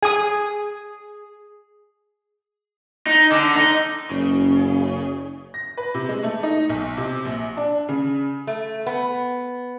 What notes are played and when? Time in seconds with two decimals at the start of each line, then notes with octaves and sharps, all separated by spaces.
0.03 G#4 G#5 D#6
3.06 D#4
3.31 D3
3.56 D#4
4.10 F#1 C#3
5.54 A#6
5.77 B4
5.94 C3
6.09 G#3
6.23 A3
6.43 D#4
6.69 B1
6.97 C3
7.25 A#1
7.57 D4
7.89 C#3
8.47 A3
8.87 B3